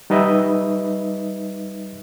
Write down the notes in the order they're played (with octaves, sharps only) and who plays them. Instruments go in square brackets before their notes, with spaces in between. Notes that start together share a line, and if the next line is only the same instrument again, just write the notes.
[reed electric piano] G3 D#4 B4 D#5 E5